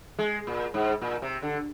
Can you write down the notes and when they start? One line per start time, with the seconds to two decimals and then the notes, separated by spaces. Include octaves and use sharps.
0.19 G#3
0.47 A#2
0.74 G#2
1.02 A#2
1.22 C3
1.42 D3